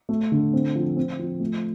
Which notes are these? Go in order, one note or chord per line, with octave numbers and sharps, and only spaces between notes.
A3
D3
C4
F3
C4
F3
A3